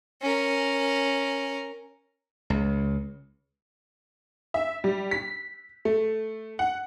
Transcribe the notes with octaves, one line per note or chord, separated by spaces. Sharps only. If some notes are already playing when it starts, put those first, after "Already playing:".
C#4 A#4
C#2
E5
G3
B6
A3
F#5